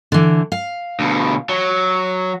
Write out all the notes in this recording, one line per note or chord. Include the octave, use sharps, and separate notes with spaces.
D3 E3
F5
D2 B2
F#3